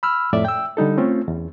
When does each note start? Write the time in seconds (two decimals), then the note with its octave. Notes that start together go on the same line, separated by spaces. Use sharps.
0.03 B5 E6 F6
0.33 F2 A2 D5 E5
0.45 G5 E6
0.77 D3 G3 D#4 A4
0.97 A3 C4 C#4 F4
1.28 E2